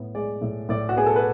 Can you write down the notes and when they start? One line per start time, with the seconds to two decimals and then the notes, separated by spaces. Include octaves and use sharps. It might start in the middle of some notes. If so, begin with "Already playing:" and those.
Already playing: A2 B3
0.15 G#3 D5
0.42 A2
0.69 A2 D5
0.89 F#4
0.96 B3 G#4
1.06 A4
1.16 B4